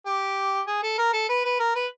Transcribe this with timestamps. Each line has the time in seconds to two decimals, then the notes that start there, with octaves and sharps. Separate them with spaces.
0.06 G4
0.67 G#4
0.83 A4
0.98 A#4
1.13 A4
1.29 B4
1.45 B4
1.60 A#4
1.75 B4